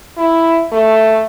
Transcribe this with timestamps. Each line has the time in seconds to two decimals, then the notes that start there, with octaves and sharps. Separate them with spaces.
0.18 E4
0.72 A3